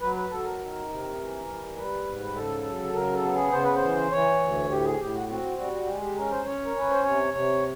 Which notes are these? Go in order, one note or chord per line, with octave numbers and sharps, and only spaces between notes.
F#3 B4
B4
F#3 A4
A#4
D#3
C3
E3
G3
G3 B4
G#2
C#3 A4
F#3
C#3 A#4
A4
B3
G#4
C#3 C5
B4
C5
E3
E3 C#5
D2
A2 G4
G#4
A2 G4
F#4
C4 F#4
G3 F#4
G#3 G4
G4
C#4 A#4
C5
C#4 C#5
A#4
C#4 B4
C5
C3 C#5
C3 C#5